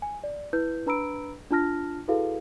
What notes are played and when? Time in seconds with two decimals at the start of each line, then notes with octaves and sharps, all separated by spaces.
0.02 G#5
0.24 D5
0.53 E4 B4 G6
0.86 D4 B4 A#5 B5 E6 D7
1.51 D4 F4 A5 F6 A#6
2.08 E4 F#4 G#4 A4 B4 F5